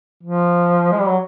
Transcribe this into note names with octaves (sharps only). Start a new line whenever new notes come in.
F3
G#3
G3
F#3